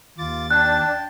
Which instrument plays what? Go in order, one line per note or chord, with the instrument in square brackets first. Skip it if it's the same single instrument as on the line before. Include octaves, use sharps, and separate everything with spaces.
[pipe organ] D#2 A6 [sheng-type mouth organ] F4 D6
[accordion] D4 [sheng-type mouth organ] G5 A5 [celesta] F#6